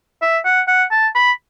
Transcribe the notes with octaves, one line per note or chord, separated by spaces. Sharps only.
E5
F#5
F#5
A5
B5